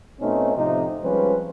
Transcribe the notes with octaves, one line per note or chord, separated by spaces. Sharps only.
B2 A3 C4 C#4 D#4
A2 C3 F3 D#4
F3 G3 G#3 C4 C#4 B4